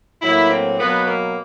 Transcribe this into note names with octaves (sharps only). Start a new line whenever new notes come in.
A2 F#3 A#3 E4
C4
B2 F#3 A#3 B3
A#3